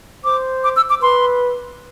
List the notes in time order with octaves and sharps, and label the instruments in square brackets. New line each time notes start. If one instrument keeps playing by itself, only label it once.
[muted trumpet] C5 [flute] D6
[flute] D6
E6
D6
[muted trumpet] B4 [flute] C6